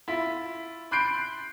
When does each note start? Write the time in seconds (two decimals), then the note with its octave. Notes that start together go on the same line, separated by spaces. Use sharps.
0.08 E4 F4 B6
0.91 B5 C6 F#6 G6 C7 D7